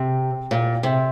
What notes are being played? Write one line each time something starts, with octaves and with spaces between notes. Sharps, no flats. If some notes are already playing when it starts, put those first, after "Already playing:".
Already playing: C3
A#2
C3